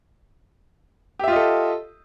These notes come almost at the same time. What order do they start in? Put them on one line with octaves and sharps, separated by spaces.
G4 E5 F4 D#5 A4